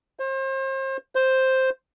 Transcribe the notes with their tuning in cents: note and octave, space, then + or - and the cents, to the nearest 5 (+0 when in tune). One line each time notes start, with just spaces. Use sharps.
C5 +35
C5 +0